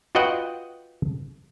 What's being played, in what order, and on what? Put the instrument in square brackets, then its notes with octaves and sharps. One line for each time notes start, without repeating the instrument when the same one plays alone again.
[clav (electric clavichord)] F4 F#4 B4 D#5 F#5 G5